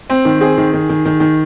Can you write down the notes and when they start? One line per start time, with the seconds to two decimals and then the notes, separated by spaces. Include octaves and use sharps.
0.10 C4
0.25 D#3
0.40 C4 G#4
0.57 D#3
0.73 D#3
0.89 D#3
1.05 D#3
1.20 D#3